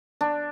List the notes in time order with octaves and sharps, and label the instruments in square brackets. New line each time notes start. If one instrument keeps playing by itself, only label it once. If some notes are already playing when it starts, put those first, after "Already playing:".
[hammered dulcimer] D4